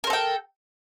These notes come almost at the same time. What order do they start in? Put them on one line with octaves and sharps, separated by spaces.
A#4 C5 A4 G5